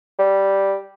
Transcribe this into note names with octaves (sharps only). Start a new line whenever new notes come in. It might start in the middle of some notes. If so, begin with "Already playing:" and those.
G3